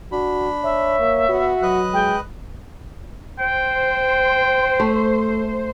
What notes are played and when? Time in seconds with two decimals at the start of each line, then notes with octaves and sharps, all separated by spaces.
0.12 D4 F#4 B5
0.63 C#5 E5
0.99 A#3
1.29 B3 F#4
1.62 F#3 B4 D#5 F#6
1.94 G#3 G5
3.40 C5 G5
4.80 A3